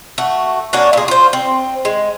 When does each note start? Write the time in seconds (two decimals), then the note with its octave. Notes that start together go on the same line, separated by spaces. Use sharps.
0.18 A3 F#4
0.73 A#3 C#4 D4 F#4
0.93 A#2 G#4
1.08 F4 C5
1.33 C4
1.85 G#3